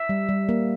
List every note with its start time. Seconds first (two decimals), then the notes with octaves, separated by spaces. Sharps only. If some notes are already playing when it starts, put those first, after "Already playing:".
Already playing: E5
0.09 G3
0.29 G3
0.49 A#3